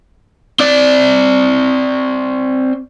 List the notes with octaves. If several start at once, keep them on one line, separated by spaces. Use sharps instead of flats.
C4 D5